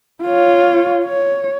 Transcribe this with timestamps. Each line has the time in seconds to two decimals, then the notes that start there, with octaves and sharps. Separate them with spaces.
0.23 F4 C#5
1.04 C#5